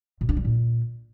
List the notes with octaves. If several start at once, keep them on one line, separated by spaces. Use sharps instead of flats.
B2
D4
G3
A#2